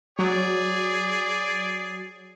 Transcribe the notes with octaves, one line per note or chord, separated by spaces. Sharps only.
F#3 G#4 D5